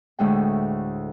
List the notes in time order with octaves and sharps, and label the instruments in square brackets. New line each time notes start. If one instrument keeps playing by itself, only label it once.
[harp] D2 A2 G#3 G5